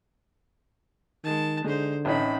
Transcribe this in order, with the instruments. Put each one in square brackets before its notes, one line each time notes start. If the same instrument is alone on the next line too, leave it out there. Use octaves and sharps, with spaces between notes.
[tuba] D#3 [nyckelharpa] G#3 A5
[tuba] D3 [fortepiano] G#3 [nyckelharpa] D#4 C5
[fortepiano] A1 C#4 D#4 [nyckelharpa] C4 B5